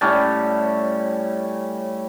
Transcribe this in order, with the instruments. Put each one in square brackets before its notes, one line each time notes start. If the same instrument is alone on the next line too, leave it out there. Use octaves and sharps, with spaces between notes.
[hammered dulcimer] A2 G3 C#4 A5